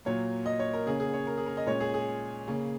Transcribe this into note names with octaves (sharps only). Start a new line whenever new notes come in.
A#2 F#3 A#3 C#5
D#5
C#5
A#4
C#3 A#3 C#4 G#4
G#4
C#5
A#4
G#4
A#4
D#5
A#2 G#3 C#4 C#5
G#4
G#4
C#3 A#3 C#4